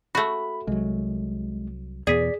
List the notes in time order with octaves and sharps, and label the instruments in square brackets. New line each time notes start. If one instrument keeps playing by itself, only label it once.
[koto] A3 F#4 [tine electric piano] B5
[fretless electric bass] C2 F#3 [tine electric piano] G#3
[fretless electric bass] E2 B2 B3 [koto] G#4 [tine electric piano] D5 B6